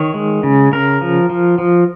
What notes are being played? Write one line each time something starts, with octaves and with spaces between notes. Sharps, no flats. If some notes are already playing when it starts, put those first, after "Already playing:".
Already playing: D#3 C#5
G#3
C#3
C#3 A#4
F3
F3
F3